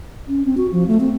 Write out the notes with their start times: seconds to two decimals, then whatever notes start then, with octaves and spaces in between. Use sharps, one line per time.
0.28 C#4
0.45 C4
0.57 F#4
0.72 F3
0.87 A3
1.00 C4